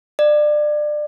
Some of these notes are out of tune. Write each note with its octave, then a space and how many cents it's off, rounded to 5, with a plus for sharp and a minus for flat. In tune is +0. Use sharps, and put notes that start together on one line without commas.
D5 +25